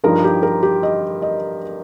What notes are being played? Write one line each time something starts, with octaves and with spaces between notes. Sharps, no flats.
G2 F3 D#4 A#4
G4
A#4
G4
D#5
D#5